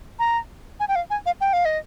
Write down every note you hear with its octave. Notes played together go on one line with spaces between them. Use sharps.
A#5
G#5
G5
F5
G#5
F5
G5
F5
D#5